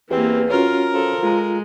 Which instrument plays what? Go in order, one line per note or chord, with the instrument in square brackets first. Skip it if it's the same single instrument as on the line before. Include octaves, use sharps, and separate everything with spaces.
[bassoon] E2 [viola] E3 A#3 [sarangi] C4 [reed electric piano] G4
[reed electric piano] C#4 F#4 C#5 [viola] F4 [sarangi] A#4
[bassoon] F3 [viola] A4
[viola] G#3 [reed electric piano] F4 A#5